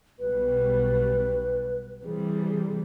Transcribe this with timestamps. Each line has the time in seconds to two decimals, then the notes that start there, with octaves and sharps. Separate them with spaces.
0.20 B1 B2 G3 B4
2.05 C3 E3 G3 G#4